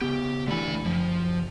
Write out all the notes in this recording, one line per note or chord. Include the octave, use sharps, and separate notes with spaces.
C#3 B3 G4
D3 E3 A3 B5
F#1 F3